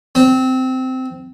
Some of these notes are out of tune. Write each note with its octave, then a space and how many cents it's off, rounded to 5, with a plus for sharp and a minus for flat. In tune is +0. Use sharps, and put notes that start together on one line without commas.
C4 -15